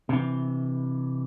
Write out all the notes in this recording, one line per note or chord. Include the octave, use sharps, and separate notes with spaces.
C3 E3